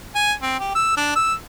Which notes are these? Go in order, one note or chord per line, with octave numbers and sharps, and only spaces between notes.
G#5
C4
G4
E6
D4
E6